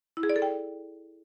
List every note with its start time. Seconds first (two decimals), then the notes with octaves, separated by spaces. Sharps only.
0.17 E4
0.23 G#4
0.29 D5
0.36 A4
0.42 G5